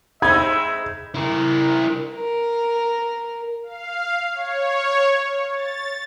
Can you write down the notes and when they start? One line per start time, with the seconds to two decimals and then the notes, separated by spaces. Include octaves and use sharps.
0.22 G#3 C4 D#4 E5 B5 G#6
1.15 E4 A#4
2.14 A#4
3.63 F5
4.32 C#5
5.53 A6